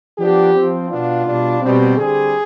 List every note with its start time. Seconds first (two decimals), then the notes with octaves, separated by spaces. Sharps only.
0.16 F3 B3 D4 G4
0.53 F3 C4
0.88 B2 B3 D4 F4
1.24 B2 G3 D4
1.60 B2 G3 C4
1.96 D3 G3 C4 G#4